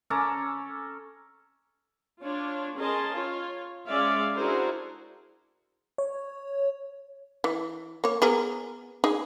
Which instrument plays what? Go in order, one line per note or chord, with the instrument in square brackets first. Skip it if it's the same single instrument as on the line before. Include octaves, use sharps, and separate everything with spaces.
[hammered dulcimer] C#4 A4 D5 A#5
[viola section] D4 F4 C#5
C#4 G#4 A#4 D#5 A5 C6
F4 C#5
G#3 C#4 D5 E5 F5
D4 E4 F#4 G#4 A#4 C5
[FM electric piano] C#5
[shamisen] E3
A#3 C#5
B3 G#4 A#4
D#4 G#4